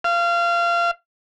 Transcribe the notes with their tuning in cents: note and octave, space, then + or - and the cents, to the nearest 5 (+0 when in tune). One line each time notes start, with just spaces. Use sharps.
F5 -25